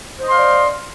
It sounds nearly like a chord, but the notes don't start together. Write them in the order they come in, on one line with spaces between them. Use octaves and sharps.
C5 D#5 C6 F5 D5